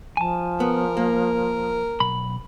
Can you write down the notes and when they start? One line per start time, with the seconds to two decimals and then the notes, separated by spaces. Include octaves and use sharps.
0.17 F3 G#5 A5
0.60 B3 A#4
0.97 A#3
2.00 B1 B5